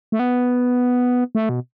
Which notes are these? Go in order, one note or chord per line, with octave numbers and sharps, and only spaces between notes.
A3
B3
A3
B2